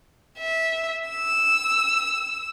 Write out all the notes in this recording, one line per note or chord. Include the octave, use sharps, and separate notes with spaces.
E5
E6